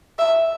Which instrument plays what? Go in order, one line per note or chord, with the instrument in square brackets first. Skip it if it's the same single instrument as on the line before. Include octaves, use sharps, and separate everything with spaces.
[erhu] E5